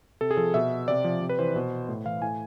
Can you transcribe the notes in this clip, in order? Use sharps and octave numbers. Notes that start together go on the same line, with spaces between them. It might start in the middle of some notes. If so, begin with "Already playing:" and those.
C3 A4
G#4
F3 A4
B2 E5
C3 D5
F3
C3
B4
E3 C5
B2
A2
E3 F5
A2 G#5